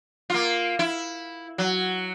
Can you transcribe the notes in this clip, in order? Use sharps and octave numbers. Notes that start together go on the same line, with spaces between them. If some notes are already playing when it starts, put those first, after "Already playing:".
A#3 F4
E4
F#3